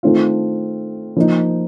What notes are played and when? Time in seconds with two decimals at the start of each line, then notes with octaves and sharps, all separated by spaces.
0.03 D#3 A3 C4 F4
1.16 F3 A#3 D#4